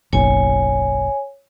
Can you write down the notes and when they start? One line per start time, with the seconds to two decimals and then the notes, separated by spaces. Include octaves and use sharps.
0.13 F#1 B1 C#5 G#5